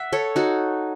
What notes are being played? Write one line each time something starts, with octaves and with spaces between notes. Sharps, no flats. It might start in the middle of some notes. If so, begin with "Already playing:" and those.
Already playing: E5 F#5
A4 C#5
D#4 F#4